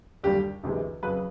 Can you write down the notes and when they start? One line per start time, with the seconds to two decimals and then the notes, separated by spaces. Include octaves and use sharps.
0.24 D#2 D3 G3 G4
0.63 D2 C3 E3 G#3
1.02 F2 C#3 F#3 B4